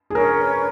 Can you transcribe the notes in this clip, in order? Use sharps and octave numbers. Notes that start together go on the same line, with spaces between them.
G#4
C#4 A#4
B4